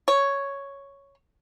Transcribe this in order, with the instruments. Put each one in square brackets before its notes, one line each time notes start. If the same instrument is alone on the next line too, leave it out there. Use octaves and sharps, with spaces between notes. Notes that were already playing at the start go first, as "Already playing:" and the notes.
[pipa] C#5